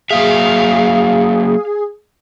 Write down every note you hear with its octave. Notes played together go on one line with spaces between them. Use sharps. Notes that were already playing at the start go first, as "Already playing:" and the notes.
F#3 A#3 G#4 E5 F5